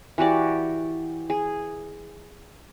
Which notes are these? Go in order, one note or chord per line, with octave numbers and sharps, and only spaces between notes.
E3 F#4 G4 D5
G#4